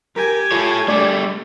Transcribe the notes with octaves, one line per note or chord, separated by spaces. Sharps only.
G4 A#4 G#5
F4 A4 C#5
G3 A3 D4 D5